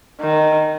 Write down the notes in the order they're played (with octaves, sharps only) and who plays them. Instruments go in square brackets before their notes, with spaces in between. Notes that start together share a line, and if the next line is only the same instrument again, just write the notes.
[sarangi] D#3